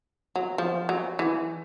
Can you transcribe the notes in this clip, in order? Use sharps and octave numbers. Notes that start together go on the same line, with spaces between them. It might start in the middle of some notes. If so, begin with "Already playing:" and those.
F#3
F3
F#3
E3